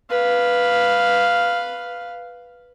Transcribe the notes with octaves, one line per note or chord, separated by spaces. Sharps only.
B4 F5